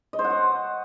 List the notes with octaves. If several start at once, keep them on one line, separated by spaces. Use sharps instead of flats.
D#5
C5
F#5
C#6